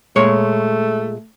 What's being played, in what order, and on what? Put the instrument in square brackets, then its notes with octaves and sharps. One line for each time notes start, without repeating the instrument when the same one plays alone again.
[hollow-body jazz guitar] A#2 G#3 C#5 [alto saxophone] A3